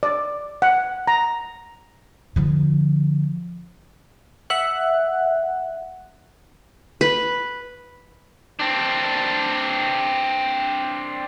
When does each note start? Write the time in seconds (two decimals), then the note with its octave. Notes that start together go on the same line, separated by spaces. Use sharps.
0.03 D5
0.62 F#5
1.07 A#5
2.36 D3 F3
4.50 E5 F#5 F#6
7.01 B4
8.59 C4 D4